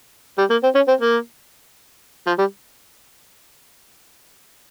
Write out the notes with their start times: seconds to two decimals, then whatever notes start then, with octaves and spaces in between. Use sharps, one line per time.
0.38 G3
0.50 A#3
0.63 C4
0.75 C#4
0.88 C4
1.01 A#3
2.27 F3
2.39 G3